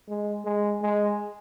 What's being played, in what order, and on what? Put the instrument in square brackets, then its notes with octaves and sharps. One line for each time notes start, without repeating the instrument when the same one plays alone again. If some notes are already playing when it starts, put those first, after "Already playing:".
[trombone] G#3
G#3
G#3